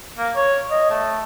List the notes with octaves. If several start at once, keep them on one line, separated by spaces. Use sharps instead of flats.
A#3
C#5
D#5
A3